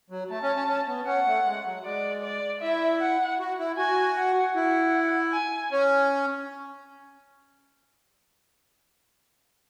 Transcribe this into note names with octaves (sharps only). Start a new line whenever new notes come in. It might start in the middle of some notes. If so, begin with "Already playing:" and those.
F#3
A3 A5
C#4
C#4
C#4
B3
C#4 F#5
A3
G#3
F#3
G#3 D5
D5
E4 E5
F#5
F#4
E4
F#4 G#5
F#5
E4 F#5
G#5
C#4